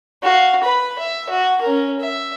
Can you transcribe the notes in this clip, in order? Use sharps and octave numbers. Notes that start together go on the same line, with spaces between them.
F#4 F5
B4 B5
E5
F#4
C#4 A#4
E5